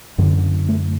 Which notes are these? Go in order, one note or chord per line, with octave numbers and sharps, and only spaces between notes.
F#2 D3 E3
A3